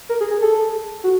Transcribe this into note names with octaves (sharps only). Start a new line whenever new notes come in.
A#4
G#4
G#4
A4
F#4